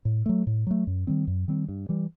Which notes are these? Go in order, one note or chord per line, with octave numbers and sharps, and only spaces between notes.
A2
F#3 A3
A2
F#3 A3
F#2
D#3 G3 C4
F#2
D#3 G3 C4
G2
E3 G3